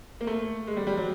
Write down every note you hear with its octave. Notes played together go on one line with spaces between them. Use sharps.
A#3
A3
G#3
G3
G3
F#3